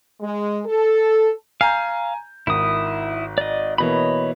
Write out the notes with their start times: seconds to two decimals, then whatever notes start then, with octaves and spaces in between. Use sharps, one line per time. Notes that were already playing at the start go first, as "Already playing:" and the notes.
0.20 G#3
0.66 A4
1.61 F5 G#5 A#5 G6
2.47 G#1 D#3 E4 D#6
3.38 D5 D#5
3.78 B2 E3 A#3 C#5 D#5 B5